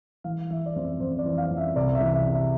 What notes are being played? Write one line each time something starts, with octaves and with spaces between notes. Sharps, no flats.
E3 F5
E3 E5
D5
F2 C5
F2 C5
D5
E3
F5
F2
E5
C2 D5
E5
E3
E5
C3
E5